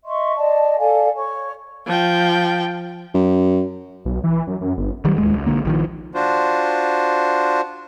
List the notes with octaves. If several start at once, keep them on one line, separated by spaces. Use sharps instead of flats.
D#5 E5 C6 C#6
D5 D#5 A5
A4 D5 F5 G#5
C#5 C#6
F3 G5
F#2
B1
E3
F#2
F#2
G1
D#3 F#3 G3
D1 D#2 G#3
C#2
B1 D3 A#3
A#1 D#3 F3
D4 F4 F#4 C5